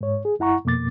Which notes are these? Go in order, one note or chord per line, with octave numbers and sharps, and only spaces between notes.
G#2 C#5
G#4
F#2 E4 F#5 A#5 C#6
F2 B2 A#3 D6 A6